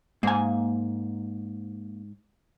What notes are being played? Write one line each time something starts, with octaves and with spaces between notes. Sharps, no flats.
G#2 A#3 G#5